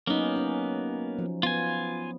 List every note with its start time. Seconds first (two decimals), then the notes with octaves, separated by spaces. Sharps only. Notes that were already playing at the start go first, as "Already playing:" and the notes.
0.07 F#3 A#3 B3 C#4 D#4
0.36 C#4
1.18 F3
1.43 B3 F4 G#5